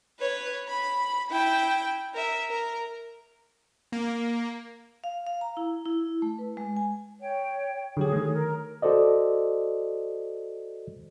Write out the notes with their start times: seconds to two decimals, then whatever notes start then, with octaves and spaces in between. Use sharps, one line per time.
0.19 B4 C#5
0.69 B5
1.31 E4 G5
2.14 A#4 E5
2.50 A#4
3.92 A#3
5.04 F5
5.27 F5
5.41 A#5
5.57 E4
5.86 E4
6.22 A3
6.39 B4
6.57 G#3
6.77 G#5
7.21 C#5 G5
7.97 D3 F#3 G4 G#4 C#5
8.13 D#3 A3
8.34 A#4
8.82 F#4 A4 C5 D5 D#5